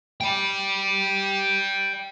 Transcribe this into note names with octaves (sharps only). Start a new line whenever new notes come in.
D5 G5